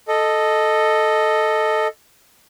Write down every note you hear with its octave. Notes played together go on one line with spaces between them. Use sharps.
A4 D#5